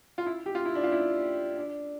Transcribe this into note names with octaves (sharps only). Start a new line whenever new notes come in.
F4
E4
G4
F4
E4
D4
F4
E4
D4